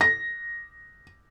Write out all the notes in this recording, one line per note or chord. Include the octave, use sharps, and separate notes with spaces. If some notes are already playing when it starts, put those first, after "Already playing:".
A#6